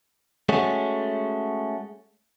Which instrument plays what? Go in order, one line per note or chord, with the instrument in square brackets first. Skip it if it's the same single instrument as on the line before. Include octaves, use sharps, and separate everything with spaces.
[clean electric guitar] G#3 A3 C#4 F#4